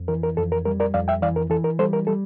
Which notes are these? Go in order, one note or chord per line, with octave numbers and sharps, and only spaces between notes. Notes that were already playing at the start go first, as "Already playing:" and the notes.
Already playing: F2
E3 A#4
A#4
F2 A4
A#4
G3 A#4
A#4 D5
F2 D5 F5
E5 G5
E3 D5 F5
A#4
E3 A4
A#4
G3 A4 C5
A#4
G3 A4